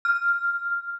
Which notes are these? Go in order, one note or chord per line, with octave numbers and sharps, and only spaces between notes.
F6